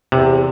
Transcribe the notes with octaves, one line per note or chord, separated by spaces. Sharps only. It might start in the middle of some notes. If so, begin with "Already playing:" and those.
E2 C3